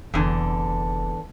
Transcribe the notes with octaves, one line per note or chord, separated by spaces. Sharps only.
F1 E2 D3